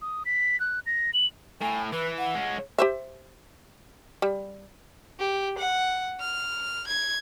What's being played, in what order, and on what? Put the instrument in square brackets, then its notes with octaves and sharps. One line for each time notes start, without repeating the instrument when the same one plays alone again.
[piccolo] D#6
B6
F#6
A#6
F#7
[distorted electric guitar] A2 [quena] G#5
[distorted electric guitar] E3 [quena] B4
[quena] F#5
[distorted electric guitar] G#3 C#4
[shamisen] G4 C5 E5
G3
[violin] G4
F#5
F6
G#6